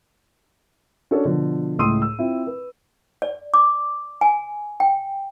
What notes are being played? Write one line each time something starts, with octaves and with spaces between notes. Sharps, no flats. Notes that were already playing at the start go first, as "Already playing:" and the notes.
C#4 D4 F#4 A4 C#5
B2 D3 F3 B3
C#2 A2 C6 D#6 E6 D#7
E6
C4 E4 F4
B4
D5
D6
G#5
G5